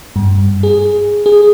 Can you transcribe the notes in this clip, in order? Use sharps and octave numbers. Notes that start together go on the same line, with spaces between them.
G2
G#4
G#4